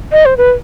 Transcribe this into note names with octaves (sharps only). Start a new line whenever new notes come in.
D#5
C5
B4